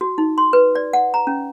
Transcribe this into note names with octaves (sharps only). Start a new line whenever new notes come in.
F#4
D#4
C6
B4
D5
F#5
A#5
C#4